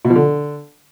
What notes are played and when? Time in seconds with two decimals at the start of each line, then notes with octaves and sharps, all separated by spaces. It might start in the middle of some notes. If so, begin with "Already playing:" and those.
0.05 B2
0.10 F3
0.16 D3